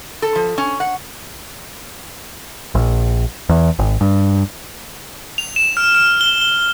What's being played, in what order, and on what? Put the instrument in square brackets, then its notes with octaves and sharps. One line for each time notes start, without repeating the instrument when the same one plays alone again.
[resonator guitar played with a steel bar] A4
F3
C#4
F#5
[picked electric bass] A#1
E2
G#1
G2
[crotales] F7
E7
F6
F6
G7
G7